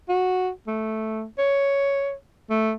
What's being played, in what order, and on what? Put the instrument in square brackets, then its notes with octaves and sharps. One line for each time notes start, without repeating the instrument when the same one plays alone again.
[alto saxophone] F#4
A3
C#5
A3